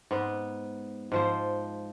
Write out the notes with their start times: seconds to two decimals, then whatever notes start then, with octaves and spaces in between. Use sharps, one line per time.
0.11 G#2 B3
1.12 G#2 F3 C5